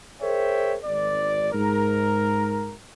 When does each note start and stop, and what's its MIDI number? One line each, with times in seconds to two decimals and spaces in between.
0.22 0.76 68
0.22 0.76 70
0.22 0.76 72
0.22 0.76 73
0.22 0.76 76
0.22 0.76 79
0.85 1.52 32
0.85 1.52 74
1.53 2.74 44
1.53 2.74 70